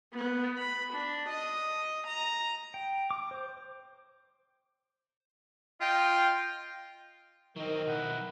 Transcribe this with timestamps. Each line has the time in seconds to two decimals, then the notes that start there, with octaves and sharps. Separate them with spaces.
0.14 B3
0.58 B5
0.93 D4
1.29 D#5
2.07 A#5
2.74 G5
3.11 D6
3.31 C5
5.81 F4 D#5 G5
7.57 D#3 F#3 C4 A#4 D#5
7.87 B1 E4 F#5